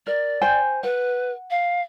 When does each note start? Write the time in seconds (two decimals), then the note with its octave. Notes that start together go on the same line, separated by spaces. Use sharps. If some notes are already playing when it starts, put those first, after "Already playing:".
0.07 A#4 D5
0.42 C5 G5 G#5
0.83 B4 F#5
1.50 F5